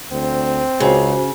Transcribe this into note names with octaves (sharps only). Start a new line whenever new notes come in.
D2 C4
C#2 C#3 F#4 C5